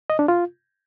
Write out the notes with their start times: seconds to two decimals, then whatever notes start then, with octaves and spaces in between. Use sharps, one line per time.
0.10 D#5
0.19 D4
0.28 F4